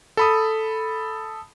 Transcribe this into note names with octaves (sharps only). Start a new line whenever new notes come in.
A4 B5 D#6